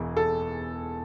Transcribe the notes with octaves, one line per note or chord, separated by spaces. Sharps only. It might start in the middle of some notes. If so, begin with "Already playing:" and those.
Already playing: E1 E2 E3
A4